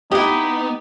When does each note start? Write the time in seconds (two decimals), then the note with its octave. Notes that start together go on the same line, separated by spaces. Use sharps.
0.12 B3 D#4 E4 G4 D#5